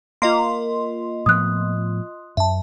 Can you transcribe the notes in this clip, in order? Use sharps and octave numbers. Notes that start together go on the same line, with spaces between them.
A#3 F4 D#5 C6
A2 F3 B3 D#6 F#6
F#2 E5 A5